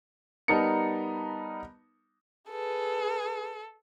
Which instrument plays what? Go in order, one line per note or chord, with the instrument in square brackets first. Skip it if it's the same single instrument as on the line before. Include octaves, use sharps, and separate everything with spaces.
[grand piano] G3 B3 D#4 A#4 A5 C#7
[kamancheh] G#4 B4 [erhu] A4